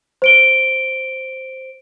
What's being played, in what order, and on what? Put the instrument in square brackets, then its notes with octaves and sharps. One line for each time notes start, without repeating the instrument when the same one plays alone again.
[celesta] C5 D7 G7